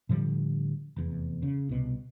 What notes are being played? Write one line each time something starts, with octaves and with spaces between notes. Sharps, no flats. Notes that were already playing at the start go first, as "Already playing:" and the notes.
A2 D3 F3 G3
F1 E2
C#3
C2 B2